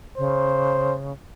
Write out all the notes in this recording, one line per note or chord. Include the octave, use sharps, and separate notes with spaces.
C#3 C5